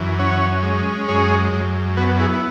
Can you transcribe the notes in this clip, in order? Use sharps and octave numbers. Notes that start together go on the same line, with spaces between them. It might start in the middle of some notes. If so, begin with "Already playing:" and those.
Already playing: F#2 E3
C#4 C#5 F#5
G#3
F#2 G#4 C#5
F#2
B3 F#4 B4
E4 G#4
E4